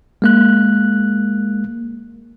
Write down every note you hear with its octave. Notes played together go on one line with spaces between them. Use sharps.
G#3 A#3 F#6